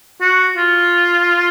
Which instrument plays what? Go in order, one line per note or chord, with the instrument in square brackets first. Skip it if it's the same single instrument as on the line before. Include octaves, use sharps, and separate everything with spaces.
[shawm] F#4
F4